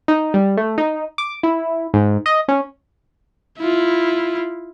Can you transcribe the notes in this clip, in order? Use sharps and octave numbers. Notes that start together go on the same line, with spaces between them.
D#4
G3
A3
D#4
D6
E4
G#2
D#5
C#4
E4 F4